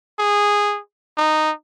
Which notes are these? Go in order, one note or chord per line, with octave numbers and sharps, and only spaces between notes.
G#4
D#4